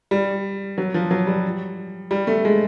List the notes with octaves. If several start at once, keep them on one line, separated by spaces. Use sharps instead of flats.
G3
F#3
F3
F#3
G3
G3
A3
G#3